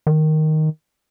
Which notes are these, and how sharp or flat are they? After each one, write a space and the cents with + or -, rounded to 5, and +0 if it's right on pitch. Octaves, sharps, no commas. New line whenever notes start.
D#3 +0